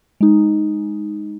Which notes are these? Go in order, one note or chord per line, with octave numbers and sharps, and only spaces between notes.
G#3 D#4